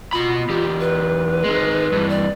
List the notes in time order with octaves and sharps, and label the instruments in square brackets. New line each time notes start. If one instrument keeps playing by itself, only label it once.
[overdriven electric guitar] B2 B5 [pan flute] F4
[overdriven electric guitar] E2 G4
[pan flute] B4
[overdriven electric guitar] D#3 G#3
G2 E3
[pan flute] D5